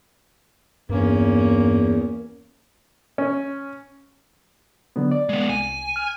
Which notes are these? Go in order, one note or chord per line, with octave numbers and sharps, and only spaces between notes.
E2 G2 A#3 C#4
C#4
D3 F#3 B3
D5
G#3 B3
C2 G#5
F6